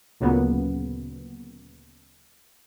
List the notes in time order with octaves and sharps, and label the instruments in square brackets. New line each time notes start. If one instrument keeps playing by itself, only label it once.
[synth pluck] D2 A#2 C#3 F#3 A#3 B3